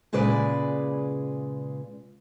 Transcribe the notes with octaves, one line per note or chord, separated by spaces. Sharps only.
A#2 C#3 G#3 B4 D5